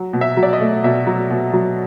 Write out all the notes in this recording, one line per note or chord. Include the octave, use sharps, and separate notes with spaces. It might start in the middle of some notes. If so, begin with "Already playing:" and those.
Already playing: F#3
B2
E5
F#3
D5
D#5
A3
B2 E5
F#3
B2
F#3